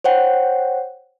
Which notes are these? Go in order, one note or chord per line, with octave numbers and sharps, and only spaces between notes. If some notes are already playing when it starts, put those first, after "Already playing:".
C5 C#5 F#5 G5